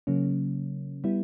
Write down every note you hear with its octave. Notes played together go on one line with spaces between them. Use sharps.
C#3 F#3 A#3 C#4
G3 B3 E4